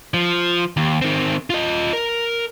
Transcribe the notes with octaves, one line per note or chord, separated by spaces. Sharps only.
F3
D#2
D#3 C4
F4 D#5
A#4